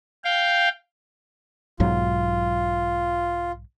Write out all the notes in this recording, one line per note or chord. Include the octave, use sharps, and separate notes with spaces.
F5 G5
B1 G#2 F#3 F4